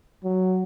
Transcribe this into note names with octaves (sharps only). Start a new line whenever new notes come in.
F#3